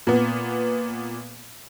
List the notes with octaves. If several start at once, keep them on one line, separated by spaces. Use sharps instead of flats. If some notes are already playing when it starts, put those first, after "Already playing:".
A#2 B3